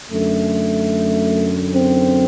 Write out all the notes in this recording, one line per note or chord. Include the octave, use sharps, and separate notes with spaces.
F#2 D3 A3
C4